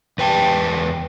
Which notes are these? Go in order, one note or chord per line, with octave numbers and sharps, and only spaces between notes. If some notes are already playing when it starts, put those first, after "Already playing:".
E2 B4 G5 A5